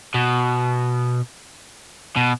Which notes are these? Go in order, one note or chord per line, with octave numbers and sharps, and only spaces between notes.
B2
B2